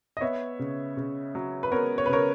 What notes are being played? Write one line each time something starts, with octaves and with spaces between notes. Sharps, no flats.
D#5
B3 C#5 E5
C#3
C#3
F#3
B4
B3 A#4 C#5
C#5
B4
C#3 A#4 C#5